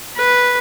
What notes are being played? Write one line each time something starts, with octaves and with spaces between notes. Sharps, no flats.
B4